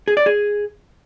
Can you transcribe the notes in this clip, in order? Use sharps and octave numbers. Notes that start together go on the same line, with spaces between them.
G#4
D5
G#4